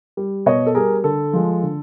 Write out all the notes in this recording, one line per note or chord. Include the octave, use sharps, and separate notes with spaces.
G3
B2 C#5 D#5
A4
G3 G#4 A#4
D3 A4
F3 G#3
D3